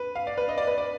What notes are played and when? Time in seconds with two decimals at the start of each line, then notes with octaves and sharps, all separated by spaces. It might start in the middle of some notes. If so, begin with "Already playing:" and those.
Already playing: B4
0.15 F5
0.27 D5
0.37 B4
0.49 D#5
0.58 D5
0.67 B4
0.78 D5